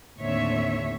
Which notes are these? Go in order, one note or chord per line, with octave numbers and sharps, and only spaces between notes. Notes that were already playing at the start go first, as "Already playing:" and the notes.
D#2 A2 D3 C4 C#5 E5